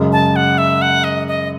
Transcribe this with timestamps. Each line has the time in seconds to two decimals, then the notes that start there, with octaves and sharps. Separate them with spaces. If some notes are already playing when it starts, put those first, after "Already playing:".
Already playing: F#2 C#3 G#3
0.12 A5
0.36 F#5
0.58 E5
0.82 F#5
1.04 D#5
1.28 D#5